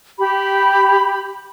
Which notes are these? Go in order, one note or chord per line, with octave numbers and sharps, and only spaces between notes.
G4 B5